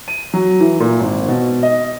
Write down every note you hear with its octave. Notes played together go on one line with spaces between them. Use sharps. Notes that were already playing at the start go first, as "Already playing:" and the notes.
D#7
F#3
E3
A#2
G#1
B2
D#5